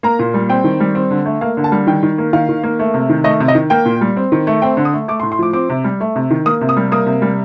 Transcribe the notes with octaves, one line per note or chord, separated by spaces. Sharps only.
A#3 A#5
A#2
G3
C4 G5
D#3
G3
C4
D3
A3
A#3 F5
D3
A5
G3
D#3 G5
D#3
A#3
D#3 F5
D#3
A#3
A3
C3
D#3
A3 D#5
C3
D#5
D#3
A#3 G5
A#2
G3
C4
D#3
A3
C4 G5
D3
D#6
A3
A3 D6
C6
A2
C6
F3 D6
C4 D6
C3
G3
A3
C3
D#3
A#3 D#6
C3
D#6
G3
A#3 D#6
C3
G3